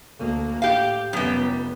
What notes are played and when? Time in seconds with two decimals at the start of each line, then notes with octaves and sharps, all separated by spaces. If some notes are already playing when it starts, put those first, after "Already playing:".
0.18 D2 A#3
0.62 A2 G4 F5
1.13 F1 F#2 G3 B3